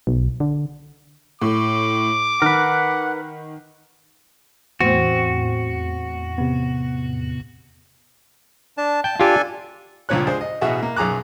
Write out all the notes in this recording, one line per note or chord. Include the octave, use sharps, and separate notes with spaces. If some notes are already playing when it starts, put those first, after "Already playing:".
B1
D3
A2 D6
D#3 A#4 B4 F#5
E2 A2 C4 F#4
C3 B3
D4 A5
G5 A5
D4 F4 G4 A4 G#5
C#2 G2 A#2 F3 C#5 F#6
G#3 D4 G#4 C5
D#5
A1 B2 F#4 G#4 E5
A#3
B1 F#2 G#4 A#5 D6 F#6